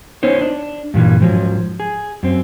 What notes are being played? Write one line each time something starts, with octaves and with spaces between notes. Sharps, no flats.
B3 D#4 C5 C#5
D4
G2 A#2 E3 G3
G#2 F3 F#3
G#4
F#2 C4